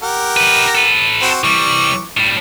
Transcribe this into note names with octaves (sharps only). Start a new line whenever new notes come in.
G4 A#4 F#5
D#4 B4
A4 B4
C4 F#4
C2 E3 G3 C#6 D6
A2 G3